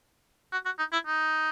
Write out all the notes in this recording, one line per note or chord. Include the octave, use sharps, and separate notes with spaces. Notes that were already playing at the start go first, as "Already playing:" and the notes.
F#4
F#4
D#4
E4
D#4